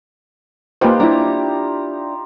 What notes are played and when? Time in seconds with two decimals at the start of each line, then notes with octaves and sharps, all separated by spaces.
0.81 A#3 D#4 F4 G4 B4 C5
1.00 D4 E4 A#5